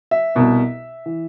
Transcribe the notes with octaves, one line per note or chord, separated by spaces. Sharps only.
E5
C2 B2 B3
E3